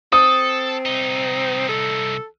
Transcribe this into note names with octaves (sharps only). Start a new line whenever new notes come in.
C4 A4 D#6
C2 D#4
A4